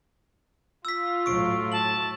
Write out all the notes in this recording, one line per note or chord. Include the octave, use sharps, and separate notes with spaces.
F4 E6 B6
A2 F#3 C#6 D7
A5 F#7